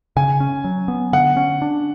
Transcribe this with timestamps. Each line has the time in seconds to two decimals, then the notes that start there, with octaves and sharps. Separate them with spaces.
0.16 C#3 G#5
0.40 C#4
0.64 F#3
0.88 B3
1.13 D3 F#5
1.37 C#4
1.62 D4